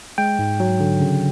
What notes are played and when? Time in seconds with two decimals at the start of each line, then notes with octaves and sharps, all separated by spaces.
0.18 G#3 G5
0.39 G#2
0.60 F#3
0.80 D3
1.00 C#3